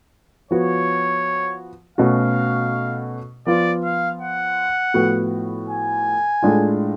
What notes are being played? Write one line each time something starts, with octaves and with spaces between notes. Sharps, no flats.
F3 B3 F#4 C#5
B2 A3 C#4 F#4 F5
F3 B3 F4 D5
F5
F#5
A2 F3 B3 F#4
G#5
A2 G#3 D4 F4